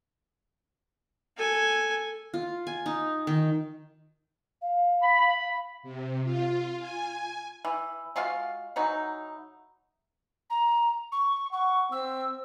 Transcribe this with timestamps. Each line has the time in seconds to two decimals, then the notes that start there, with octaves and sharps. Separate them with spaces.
1.37 A4 G#5
2.34 F4
2.67 G#5
2.86 D#4
3.27 D#3
4.62 F5
5.02 B5
5.83 C3
6.24 F4
6.79 G#5
7.65 E3
8.16 G#3 F4 F#4 F5
8.76 E3 F#3 D#4
10.50 A#5
11.12 C#6
11.53 F#5 C#6
11.92 C4 E6